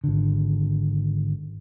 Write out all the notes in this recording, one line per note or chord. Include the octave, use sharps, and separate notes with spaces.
G#1 D3